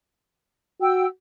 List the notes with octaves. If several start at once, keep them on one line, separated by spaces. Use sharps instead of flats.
F#4 G5 E6